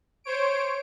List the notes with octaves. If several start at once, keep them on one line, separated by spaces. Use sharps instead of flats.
C5 C#5 D7